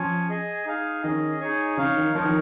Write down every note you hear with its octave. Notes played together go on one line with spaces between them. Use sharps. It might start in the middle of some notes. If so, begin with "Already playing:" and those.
Already playing: F3 C#4 C#5 G#5
G#4 D#5 G#5
D#4 G#4 F5 G#5
D#3 C#4 G#4 D#5
D#4 G#4 C#5 G#5
C#3 D#4 C#5 F5
D#3
F3 D#4 A#4 C#5
D#3